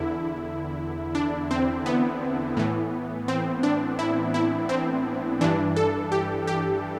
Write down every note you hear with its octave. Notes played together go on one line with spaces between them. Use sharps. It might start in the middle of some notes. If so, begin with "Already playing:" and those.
Already playing: E2 D3 E4
D4
C4
B3
A2 E3
C4
D4
E4
E4
C4
G2 E3 D4
A4
G4
G4